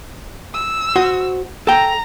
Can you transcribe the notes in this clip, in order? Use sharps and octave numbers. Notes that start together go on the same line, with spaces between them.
E6
F#4 C5
A4 G5 A#5